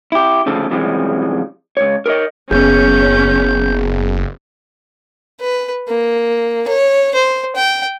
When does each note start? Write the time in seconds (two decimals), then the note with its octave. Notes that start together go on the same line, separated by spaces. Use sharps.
0.12 E4 G4
0.46 D2 C#3 F3 A4
0.71 F#2 C3 E3 F3 G3 G#3
1.77 C#2 C#5
2.06 A#4 B4 C#5 D#5
2.51 F#1 B3 C#4 G#4 G6
5.40 B4
5.88 A#3
6.68 C#5
7.14 C5
7.56 G5